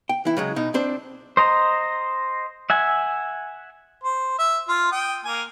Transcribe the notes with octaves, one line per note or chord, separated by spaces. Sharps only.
G5
E3 E4
C#3 F#3 G#3
B2 D#4
C4 D4 C5
C5 D#5 A#5
E5 F#5 G#5
C5
E5
F4
G5 D#6
A#3 G#5